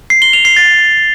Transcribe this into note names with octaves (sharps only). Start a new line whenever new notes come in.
C7
G7
F7
C7
A6